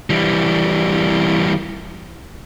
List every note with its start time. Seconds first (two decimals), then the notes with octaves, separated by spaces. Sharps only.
0.10 E3 G3